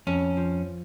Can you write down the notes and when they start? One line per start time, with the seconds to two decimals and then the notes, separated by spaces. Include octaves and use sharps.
0.07 F2 C#4
0.37 F3